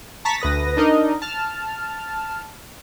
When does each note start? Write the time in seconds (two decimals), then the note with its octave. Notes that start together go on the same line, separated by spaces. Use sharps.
0.25 A5 A#5 C#6 A6 B6
0.40 D2 B4 D#6 A#6
0.77 D4 D#4 A#4 D#5
1.22 A5 F6